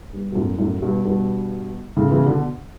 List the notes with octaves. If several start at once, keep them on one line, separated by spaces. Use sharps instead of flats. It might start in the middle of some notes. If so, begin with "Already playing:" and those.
G2
B2
F#2 A2
F#2 A2
G2 B2
G2 B2
A2 C#3
C#3 E3
B2 D3